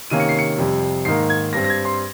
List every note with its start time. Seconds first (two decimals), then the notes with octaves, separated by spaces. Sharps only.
0.10 C3 D#3 A#3 C#4 D#7
0.20 C#7
0.29 C7
0.39 C#7
0.58 F2 C3 G3
1.05 G#2 D#3 A#3 C7
1.30 G#6
1.53 G2 G3 C4 A#6
1.64 A#6
1.70 G#6
1.85 C6